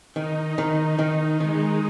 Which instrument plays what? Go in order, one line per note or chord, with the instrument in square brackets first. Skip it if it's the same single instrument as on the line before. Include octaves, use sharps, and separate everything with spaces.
[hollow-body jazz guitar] D#3 [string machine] D#4
[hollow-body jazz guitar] D#3 [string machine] D#4
[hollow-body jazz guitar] D#3
[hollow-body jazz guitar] D#3 [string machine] G#3